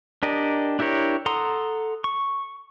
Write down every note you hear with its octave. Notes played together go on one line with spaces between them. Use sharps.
D4 G4 A#4 D#5
D4 E4 G4 A#4 C#5
A4 F#5 A#5 C6 D#6
C#6